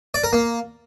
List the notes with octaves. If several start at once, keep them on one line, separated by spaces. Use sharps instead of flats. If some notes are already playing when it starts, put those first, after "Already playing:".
D5
A#4
A#3